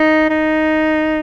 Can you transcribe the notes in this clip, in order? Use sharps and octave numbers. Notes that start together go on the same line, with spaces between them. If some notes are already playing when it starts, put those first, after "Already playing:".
Already playing: D#4
D#4